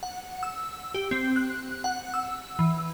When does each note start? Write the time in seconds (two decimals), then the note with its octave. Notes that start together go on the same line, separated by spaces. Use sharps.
0.03 F#5
0.43 E6
0.94 G4
1.11 C4
1.36 F#6
1.84 F#5
2.14 E6
2.59 E3